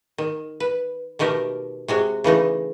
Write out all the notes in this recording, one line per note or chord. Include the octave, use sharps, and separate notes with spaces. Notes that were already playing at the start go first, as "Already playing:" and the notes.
D#3
B4
B2 D#3 A3 G4 A#4
C3 G#3 F#4
C#3 E3 A3 D#4